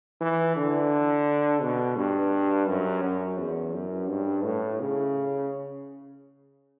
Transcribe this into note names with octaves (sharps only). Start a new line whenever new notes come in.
E3
D3
B2
G2
F#2
F#2
E2
F#2
G2
A2
C#3